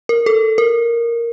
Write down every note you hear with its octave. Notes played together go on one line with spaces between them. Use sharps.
A#4
A4
A#4